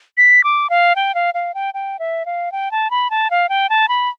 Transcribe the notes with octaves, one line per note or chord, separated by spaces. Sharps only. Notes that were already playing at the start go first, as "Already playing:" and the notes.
B6
D6
F5
G5
F5
F5
G5
G5
E5
F5
G5
A5
B5
A5
F5
G5
A5
B5